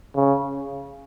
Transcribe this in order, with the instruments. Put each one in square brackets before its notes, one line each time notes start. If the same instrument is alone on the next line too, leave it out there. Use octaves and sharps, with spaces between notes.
[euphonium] C#3